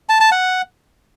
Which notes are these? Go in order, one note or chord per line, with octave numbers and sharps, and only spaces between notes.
A5
A5
F#5